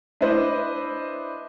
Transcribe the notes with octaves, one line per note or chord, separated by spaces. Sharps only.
D4 E4 B4 C5 D#5